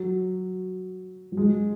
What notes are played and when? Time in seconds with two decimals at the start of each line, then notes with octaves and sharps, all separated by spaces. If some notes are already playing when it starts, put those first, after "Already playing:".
Already playing: F#3
1.32 F#3
1.37 G#3